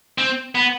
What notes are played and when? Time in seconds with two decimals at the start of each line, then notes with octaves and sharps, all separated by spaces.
0.18 C4
0.55 B3